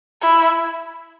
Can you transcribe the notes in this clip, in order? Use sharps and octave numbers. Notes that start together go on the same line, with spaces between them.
E4